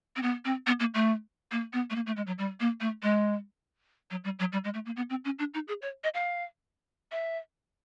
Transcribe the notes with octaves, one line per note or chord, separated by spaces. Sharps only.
C4
B3
C4
B3
A#3
A3
A#3
B3
A3
A#3
A3
G#3
F#3
G3
A#3
A3
G#3
F#3
G3
F#3
G3
G#3
A3
A#3
B3
C4
C#4
D4
D#4
G#4
C#5
D#5
F5
E5